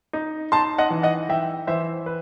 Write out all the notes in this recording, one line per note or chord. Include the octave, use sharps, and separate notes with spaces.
D#4
D#4 A5 C6
D#5 F#5
E3
D#5 F#5
E3 E5 G5
E3 C5 E5
B4